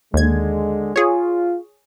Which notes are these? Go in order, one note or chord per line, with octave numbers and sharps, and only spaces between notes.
D#2 D3 G#3 G#6
F4 G#4 C#5